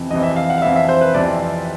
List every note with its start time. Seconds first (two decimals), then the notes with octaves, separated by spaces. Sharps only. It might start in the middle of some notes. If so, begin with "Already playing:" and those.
Already playing: F2 C3 E3
0.11 F2 C3 E3 D#5
0.23 E5
0.36 F5
0.50 F#5
0.58 F5
0.62 F2 C3 E3 E5
0.76 E5
0.89 C5
1.01 B4
1.14 F2 C3 E3 D5